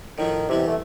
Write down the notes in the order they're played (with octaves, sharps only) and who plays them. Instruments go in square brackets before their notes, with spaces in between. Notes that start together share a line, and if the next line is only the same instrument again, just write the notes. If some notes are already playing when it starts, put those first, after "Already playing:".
[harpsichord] A2 F3 A3 [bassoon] D#3
[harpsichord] C2 E3 B3 [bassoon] C3
[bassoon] A3